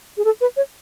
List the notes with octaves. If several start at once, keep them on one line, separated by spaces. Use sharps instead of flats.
G#4
A4
B4
C#5